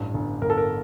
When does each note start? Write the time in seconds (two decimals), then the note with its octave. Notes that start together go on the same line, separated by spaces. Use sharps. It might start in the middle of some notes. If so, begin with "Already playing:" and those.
Already playing: A1 G2
0.14 G1
0.42 G1 A#4
0.50 A4
0.58 A#4